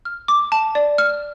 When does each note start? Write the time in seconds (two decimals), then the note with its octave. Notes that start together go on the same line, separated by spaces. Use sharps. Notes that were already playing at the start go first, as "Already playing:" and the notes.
0.05 F6
0.28 D6
0.52 A5
0.75 D5
0.98 F6